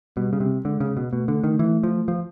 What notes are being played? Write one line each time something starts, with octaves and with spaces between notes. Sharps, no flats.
B2 G3
C#3
C3
D3 G#3
C#3
B2
B2 A3
D3
D#3
E3
F3
F3